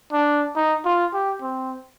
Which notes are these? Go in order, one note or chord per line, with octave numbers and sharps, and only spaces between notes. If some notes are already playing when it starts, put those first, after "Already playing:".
D4
D#4
F4
G4
C4